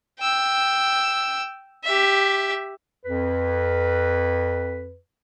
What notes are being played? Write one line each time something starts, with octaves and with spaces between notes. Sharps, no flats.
G5 E6
G4 E5
F2 B4